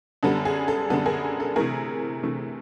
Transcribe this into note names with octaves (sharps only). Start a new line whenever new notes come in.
F#2 D3 G3 B3 A4
G#4
A4
F#2 D3 G3 B3 A4
G#4 A#4
A4
C3 E3 A3 G#4 A#4
C3 E3 A3